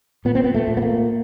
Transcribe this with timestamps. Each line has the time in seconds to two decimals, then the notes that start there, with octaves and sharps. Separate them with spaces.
0.25 A#2 B3
0.35 C4
0.44 B3
0.54 A3
0.68 A#2
0.77 B3
0.82 A#3